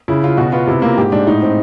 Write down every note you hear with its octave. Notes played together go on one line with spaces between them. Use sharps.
C#3 E4
C#3 F4
B2 F#4
B3 F4
C3 E4
A#3 F4
G#2 G4
G#2 D4
A2 D#4
C4